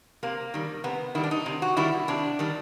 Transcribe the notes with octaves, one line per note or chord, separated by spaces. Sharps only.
C3 A#3
D#3 G3
C3 B3
D#3 G3 E4
D4
D#4
C3
F#4
D#3 G3 E4
C3 D4
D#3 G3